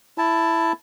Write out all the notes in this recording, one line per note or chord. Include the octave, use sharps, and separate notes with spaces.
E4 A5